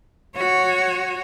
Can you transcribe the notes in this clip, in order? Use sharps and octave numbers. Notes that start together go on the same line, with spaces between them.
F#4 C#5